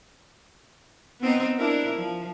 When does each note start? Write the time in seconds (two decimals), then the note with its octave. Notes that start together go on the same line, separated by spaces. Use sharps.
1.20 B3 C4 D#4
1.57 D4 E4 A#4
1.96 F3